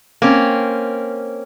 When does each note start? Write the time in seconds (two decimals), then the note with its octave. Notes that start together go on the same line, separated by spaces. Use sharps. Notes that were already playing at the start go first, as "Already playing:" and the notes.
0.22 A#3 C4 C#4